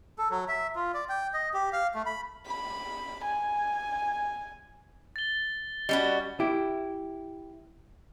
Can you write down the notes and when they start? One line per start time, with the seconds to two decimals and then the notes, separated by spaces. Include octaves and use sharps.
0.18 A4
0.30 F#3
0.48 E5
0.75 F4
0.94 D5
1.09 G5
1.34 D#5
1.54 G4
1.73 F5
1.95 A3
2.06 B5
2.46 B5
3.25 G#5
5.16 A6 G7
5.89 G3 C#4 F#4 D#5 G7
6.40 E4 G4